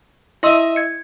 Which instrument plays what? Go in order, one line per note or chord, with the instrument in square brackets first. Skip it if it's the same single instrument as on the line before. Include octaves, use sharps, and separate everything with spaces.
[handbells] E4 C6 E6 [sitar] D#5 E5
[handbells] G#6 C#7